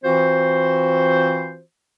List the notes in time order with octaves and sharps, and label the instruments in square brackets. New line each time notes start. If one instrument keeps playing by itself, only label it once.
[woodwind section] E3 C4 F4 F#4 C5